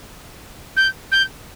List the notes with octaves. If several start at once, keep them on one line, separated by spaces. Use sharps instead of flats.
G6
G6